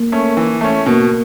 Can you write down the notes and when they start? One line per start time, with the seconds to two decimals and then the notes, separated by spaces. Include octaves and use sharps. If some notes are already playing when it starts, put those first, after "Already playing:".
Already playing: A#3
0.12 A3 C#4
0.37 E3
0.61 A3 C#4
0.86 B2 A#3